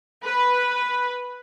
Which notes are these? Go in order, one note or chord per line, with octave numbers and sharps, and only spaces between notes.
B4